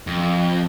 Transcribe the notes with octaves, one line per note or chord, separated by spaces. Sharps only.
F2